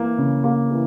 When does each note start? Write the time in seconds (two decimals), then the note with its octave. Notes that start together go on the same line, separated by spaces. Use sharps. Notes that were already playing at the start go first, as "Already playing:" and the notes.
Already playing: E3 A#3
0.18 C#3
0.44 A#3
0.71 E3